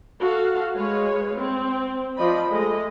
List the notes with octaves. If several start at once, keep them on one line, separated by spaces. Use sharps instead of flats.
F#4 A4 F5
G#3 B4 C#5 F5
C4
F3 D5 D#5 B5
G#3 A3 D#5